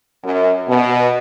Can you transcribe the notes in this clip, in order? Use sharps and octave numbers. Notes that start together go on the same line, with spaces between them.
F#2
B2